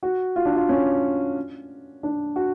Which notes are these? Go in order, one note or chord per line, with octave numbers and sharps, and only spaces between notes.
F#4
F4
D4
F4
C#4
D4
F#4